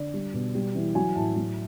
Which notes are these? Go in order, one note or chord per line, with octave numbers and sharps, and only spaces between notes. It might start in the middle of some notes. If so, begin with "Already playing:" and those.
Already playing: D3 D5
G3
B2
G3
E3
F#3 G#5
A2 A5
F#3